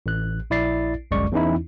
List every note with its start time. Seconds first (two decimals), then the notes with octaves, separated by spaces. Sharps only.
0.06 A1 F#6
0.50 A#1 E4 D5 A6 C7
1.11 G1 C2 F#2 G#3 D5 C#6
1.32 E2 E3 C#4 D#4 E4